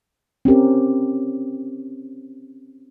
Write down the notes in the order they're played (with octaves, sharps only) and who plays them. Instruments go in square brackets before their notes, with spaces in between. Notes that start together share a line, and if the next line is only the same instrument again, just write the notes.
[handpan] C4 C#4 G4 A#4